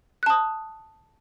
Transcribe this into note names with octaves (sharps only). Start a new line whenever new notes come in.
A5 D#6 F#6